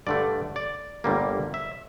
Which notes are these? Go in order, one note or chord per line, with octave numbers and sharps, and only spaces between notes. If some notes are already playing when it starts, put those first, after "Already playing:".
G2 D3 A3 D5
D5
G1 G2 D3 G3 A#3
E5